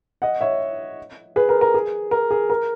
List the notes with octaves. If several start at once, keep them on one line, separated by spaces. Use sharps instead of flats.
D#5 F#5
C#5 E5
G#4 B4
A#4
A#4
G#4
A#4
G#4
A#4